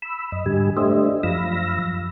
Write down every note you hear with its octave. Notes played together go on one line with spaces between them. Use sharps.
B5 E6
F#2 D#5
G#2 D3 G3 G4 G#5
A3 D4 G4 C5 D#5 E5
F#2 F3 F5 B5 E6 A#6